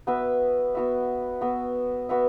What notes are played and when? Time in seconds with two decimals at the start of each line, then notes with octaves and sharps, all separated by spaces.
0.07 B3 F#4 B4 E5
0.75 B3 F#4 B4 E5
1.41 B3 F#4 B4 E5
2.09 B3 F#4 B4 E5